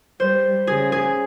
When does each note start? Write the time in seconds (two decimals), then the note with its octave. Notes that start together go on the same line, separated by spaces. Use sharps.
0.20 G3 C5
0.67 C#3 G#4
0.92 G#4